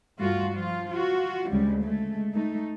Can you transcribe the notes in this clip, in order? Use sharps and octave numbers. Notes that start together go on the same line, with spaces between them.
G2 A3 F4 F#4
F3 F4
F4 F#4
D2 C#3 G3 G#3
G#3 A3
A3 D#4